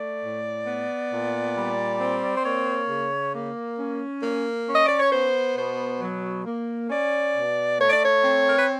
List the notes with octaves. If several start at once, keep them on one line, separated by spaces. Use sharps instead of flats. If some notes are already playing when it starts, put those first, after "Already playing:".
Already playing: A3 D5
A2
B3
A#2
G3
C4
C5
A#3 C#5
C#3
A#3
C#4
A#3
C#4
D#5
D5
C#5
B3 C5
B2 C5
F#3
A#3
C#4 D5
B2
A3 C#5
D5
C#5
C4
A#4
B4